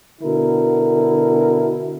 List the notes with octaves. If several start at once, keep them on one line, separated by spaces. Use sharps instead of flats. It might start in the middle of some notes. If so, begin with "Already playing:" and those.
B2 D3 E4 A#4